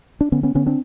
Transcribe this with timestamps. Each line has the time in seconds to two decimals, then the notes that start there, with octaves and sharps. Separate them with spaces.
0.21 D4
0.32 D3 B3 C#4
0.43 B3 C#4
0.55 D3 B3 C#4
0.66 C4 D4